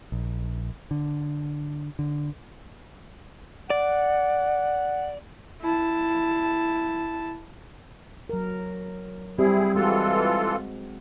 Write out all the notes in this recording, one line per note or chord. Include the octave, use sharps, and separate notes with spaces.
A#1
D3
D3
D5 F#5
E4 A5
F#3 A#4
G3 C4 E4 G#4
E3 G#3 F4 F#4 A4